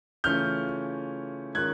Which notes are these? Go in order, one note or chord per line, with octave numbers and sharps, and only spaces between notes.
C#3 E3 A3 C#4 F4 F6 G6
D#3 G#3 C#4 F4 F#6 G#6